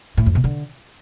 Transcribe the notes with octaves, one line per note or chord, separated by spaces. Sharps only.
A2
F2
B2
D3